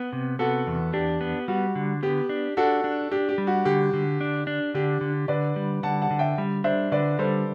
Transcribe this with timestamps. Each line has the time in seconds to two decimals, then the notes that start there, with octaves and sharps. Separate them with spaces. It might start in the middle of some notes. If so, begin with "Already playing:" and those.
Already playing: B3
0.13 C3
0.39 B3 F#4 A4
0.67 E2
0.93 D4 G4
1.21 B3
1.48 G3 F#4
1.75 D3
2.03 B3 G4
2.29 D4
2.57 D4 F#4 A4
2.84 D4
3.11 D4 G4
3.29 G4
3.38 G3
3.47 F#4
3.65 D3 G4
3.93 D3
4.21 D4
4.47 D4
4.74 D3 G4
5.01 D3
5.28 D3 B4 D5
5.56 G3
5.83 D3 F#5 A5
6.02 F#5 A5
6.11 D3
6.19 E5 G5
6.38 G3
6.64 D4 C5 E5
6.91 D3 B4 D5
7.19 G3 A4 C5